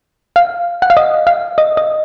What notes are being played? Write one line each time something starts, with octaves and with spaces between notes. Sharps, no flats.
F5
F#5
F5
D#5
F5
D#5
D#5